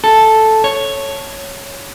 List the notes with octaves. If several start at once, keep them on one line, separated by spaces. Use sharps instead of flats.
A4
C#5